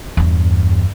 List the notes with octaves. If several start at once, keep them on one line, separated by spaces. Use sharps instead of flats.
E2 G2